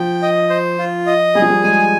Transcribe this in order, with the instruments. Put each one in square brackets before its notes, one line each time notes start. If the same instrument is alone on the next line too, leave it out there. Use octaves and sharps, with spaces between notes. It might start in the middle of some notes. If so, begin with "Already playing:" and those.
Already playing: [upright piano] F3 [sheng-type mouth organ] G5
[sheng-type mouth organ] D#5
C5
F4
D#5
[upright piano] G3 [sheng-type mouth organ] G#4
[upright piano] F3
G3
[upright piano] G#3 [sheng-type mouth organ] G#5